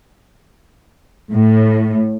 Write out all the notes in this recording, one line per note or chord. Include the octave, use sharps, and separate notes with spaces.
A2